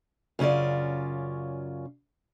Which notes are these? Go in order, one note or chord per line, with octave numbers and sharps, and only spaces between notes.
F#2 C#3 C#4 F4 D5